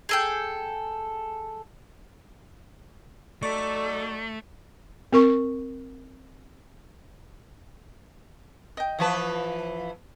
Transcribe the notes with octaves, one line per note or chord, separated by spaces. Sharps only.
G#4 A4 G5
F#3 A3 D#4 A4 D5 C#6
C4 A#4 C#6
D#5 G5
E3 F3 B4 A5 C#6 D#6